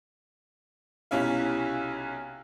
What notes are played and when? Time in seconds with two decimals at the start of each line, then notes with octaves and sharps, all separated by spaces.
1.11 B1 C3 C#4 E4 F5